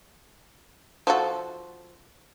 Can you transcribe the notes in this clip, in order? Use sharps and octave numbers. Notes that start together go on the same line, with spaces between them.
F3 F#4 A4